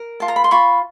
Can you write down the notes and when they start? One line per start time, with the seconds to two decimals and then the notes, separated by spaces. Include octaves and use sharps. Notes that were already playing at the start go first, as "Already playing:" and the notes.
Already playing: A#4
0.20 F4 A5
0.28 A#5
0.36 B5
0.44 C6
0.51 F4 B5 C#6